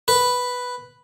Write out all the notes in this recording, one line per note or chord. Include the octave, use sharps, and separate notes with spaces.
B4